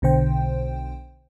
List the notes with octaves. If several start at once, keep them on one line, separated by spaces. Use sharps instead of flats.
B1 B2 D3 C5 G5